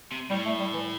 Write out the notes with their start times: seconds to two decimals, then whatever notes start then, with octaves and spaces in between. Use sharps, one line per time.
0.12 C3
0.30 A2 G3
0.46 A3
0.60 G3
0.74 E3